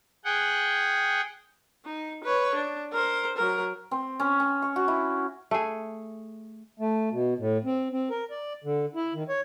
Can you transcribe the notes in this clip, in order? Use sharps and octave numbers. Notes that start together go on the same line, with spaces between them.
G#4 F#5 G5
D#4
B4 C#5
D4
A#4 C5
F#3 A#4
C4
C#4
C#4
C#6
F#4
E4
A3 G#4
A3
B2
A2
C4
C4
A#4
D5
D3
E4
D#3
C#5